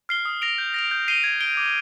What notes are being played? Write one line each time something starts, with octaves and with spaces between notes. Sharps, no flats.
F6 C7 G7
D#6
A#6 D7 F7
G6
A#6 D7 F7
G6
C7 D#7 G7
G#6
D7 G7
D6